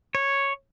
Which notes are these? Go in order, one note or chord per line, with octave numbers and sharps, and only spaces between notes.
C#5